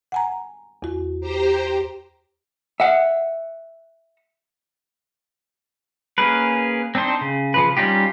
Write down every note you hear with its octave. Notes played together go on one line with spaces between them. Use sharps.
F#5 G#5 A#5
E2 F#4
G4 C5 A#5
E5 F#5
A#3 C#4 G#4 A#4 B4
C4 D4 D#4 C5
C#3
C#3 F3 B4
G3 C#4 D#4 F4 G4